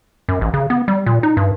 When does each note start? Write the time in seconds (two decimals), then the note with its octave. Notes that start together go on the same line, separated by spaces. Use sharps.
0.29 F#2
0.41 A1
0.54 C#3
0.70 B3
0.88 G3
1.06 A#2
1.23 D#4
1.37 G2